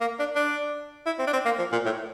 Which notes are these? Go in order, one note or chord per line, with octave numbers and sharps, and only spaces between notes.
A#3
D4
D4
E4
C4
D4
C4
A#3
F3
A#2
A2